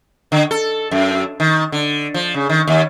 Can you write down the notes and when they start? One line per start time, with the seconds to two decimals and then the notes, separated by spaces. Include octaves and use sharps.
0.32 D3
0.51 A4
0.91 F#2
1.40 D#3
1.72 D3
2.14 F3
2.34 C#3
2.49 D#3
2.67 D#2